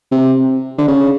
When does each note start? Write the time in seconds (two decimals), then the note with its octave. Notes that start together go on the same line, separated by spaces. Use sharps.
0.12 C3
0.78 D3
0.88 C#3